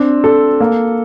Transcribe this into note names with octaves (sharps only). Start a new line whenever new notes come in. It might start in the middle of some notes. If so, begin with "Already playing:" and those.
Already playing: C4 D4
A4
A#3